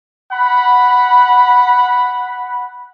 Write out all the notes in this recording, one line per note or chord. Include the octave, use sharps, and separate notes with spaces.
F#5 B5